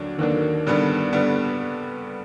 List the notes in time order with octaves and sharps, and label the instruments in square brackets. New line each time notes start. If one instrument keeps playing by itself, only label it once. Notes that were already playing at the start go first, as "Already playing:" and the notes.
Already playing: [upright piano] D#2 D3 F#3 A#3 D4
[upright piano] D#2 D3 F#3 A#3 D4 [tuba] D#3
[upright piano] G2 D3 G3 B3 D4
D3 G3 B3 D4